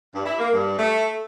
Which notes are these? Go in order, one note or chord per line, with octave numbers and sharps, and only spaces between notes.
G2
E4
A#3
G2
A3